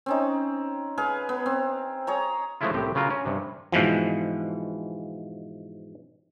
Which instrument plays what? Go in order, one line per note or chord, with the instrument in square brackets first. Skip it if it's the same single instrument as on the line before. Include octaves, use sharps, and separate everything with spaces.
[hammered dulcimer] C4 C#4 D#4
G#4 B4 F5
B3
C4
G#4 C#5 A#5
[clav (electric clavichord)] F3 G#3 A3 C#4 E4 F4
C2 A2 C4 G4
C#3 F#3 F4 A#4
C#4
G2 C3
G#2 B2 E3 F3